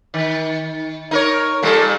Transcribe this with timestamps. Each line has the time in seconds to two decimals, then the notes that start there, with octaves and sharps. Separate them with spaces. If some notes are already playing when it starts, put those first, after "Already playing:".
0.14 D#3
1.11 D#4 A#4 C#5
1.63 A#2 G3 A4